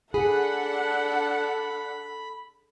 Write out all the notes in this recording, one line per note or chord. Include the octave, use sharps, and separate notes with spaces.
D4 G#4 A4 F#5 B5